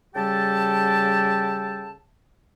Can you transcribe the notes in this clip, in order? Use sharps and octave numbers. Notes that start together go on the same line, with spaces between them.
C#3 G3 G4 A4 G5 A5